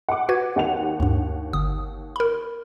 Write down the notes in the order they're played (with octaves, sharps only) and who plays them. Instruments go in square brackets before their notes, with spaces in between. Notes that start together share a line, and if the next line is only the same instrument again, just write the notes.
[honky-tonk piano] F#5 D6
[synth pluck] F#4 B4 G#6
[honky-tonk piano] D#2 F#5 F7
[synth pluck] D2 G2
G1 D#6
A#4 B5